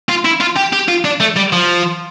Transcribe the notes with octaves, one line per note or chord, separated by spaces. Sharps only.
F4
E4
F4
G4
G4
F4
D4
A3
G3
F3